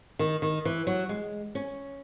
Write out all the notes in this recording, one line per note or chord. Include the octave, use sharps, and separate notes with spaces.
D#3
D#3
E3
F#3
G#3
C#4